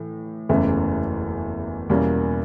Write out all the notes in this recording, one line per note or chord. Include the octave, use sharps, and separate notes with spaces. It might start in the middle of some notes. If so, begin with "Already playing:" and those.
Already playing: A2 E3
F#1 E2 C#3 E3 A3
E2 B2 G3 A#3 C#4